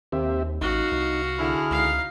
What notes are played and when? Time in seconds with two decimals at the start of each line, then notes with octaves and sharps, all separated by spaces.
0.12 D#2 C4 G4 E5
0.61 A1 D#4 F#4 F5
0.92 C2
1.39 D3 E4 G#4 F6
1.71 C#2 D#4 F5